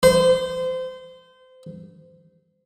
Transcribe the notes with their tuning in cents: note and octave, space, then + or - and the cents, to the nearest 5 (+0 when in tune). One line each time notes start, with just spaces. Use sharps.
C5 -25